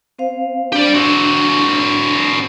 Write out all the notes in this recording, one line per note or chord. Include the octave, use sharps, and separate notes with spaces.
C4 C5 F5
D4 G4 D5
C4 F#4